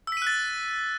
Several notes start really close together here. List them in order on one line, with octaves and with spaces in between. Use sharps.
E6 B6 D#7 F#6 A6